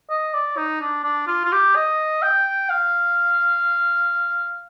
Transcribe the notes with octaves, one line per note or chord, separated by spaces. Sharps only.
D#5
D5
D#4
D4
D4
F4
F4
G4
D#5
G5
F5